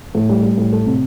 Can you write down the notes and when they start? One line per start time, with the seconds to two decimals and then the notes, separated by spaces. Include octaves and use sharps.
0.15 A2
0.29 G3
0.43 G3
0.58 A2
0.73 A3
0.86 C3